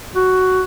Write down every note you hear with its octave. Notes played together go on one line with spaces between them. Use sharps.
F#4